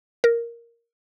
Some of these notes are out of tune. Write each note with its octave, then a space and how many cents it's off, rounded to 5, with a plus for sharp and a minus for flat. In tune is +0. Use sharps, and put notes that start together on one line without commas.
A#4 +0